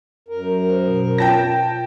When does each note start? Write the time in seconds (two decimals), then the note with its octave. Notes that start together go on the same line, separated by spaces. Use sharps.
0.28 F#2 A#4
0.70 C5
0.88 B2
1.18 F4 C#5 G5 A5 A#6